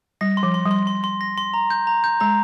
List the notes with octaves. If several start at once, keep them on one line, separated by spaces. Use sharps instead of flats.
G3 A#6
C6
F3
C6
G3
C6
C6
C6
A#6
C6
A#5
G6
A#5
G6
G#3 A#5